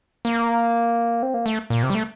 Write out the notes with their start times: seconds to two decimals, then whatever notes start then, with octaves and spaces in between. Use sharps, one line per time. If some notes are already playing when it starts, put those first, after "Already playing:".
0.25 A#3
1.23 C4
1.34 A#3
1.46 A3
1.70 A#2
1.83 C3
1.90 G3
1.95 A3